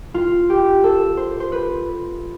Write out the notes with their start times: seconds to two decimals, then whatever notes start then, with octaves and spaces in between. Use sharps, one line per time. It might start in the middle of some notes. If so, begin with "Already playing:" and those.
0.14 F4
0.50 G4
0.84 A4
1.17 C5
1.40 C5
1.52 B4